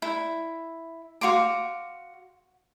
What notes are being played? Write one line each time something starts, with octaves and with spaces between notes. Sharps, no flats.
E4
F#4 F5 C6 D6